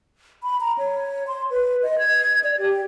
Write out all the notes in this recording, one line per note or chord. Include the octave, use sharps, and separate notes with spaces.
B5
A#5
C#5
C6
B4
D#5
G#6
D5
G4